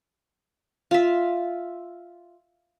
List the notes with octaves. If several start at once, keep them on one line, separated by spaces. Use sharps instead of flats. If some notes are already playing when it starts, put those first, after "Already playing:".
F4 E5